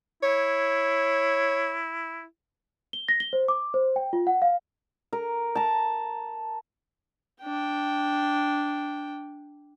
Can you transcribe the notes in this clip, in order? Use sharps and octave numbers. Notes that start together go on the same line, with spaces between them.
E4 C#5
G7
A#6
G7
C5
D6
C5
G5
F4
F#5
F5
A#4
A5 A#5
D4 G5